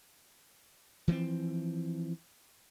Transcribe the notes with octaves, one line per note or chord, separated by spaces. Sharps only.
E3 F3 A3 C4